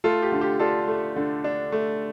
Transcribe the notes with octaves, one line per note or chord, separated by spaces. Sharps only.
A3 F4 A4
G4
D3
G4
D4 F4 A4
A3
D3
D4
A3